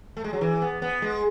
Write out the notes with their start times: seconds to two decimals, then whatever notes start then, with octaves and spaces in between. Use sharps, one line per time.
0.17 A3
0.24 G#3
0.33 F#3
0.41 E3
0.62 B3
0.82 B3
1.02 G#3